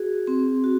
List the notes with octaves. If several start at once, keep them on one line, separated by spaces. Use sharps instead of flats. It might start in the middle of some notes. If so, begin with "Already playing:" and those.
Already playing: F#4 G#4
C4
F#4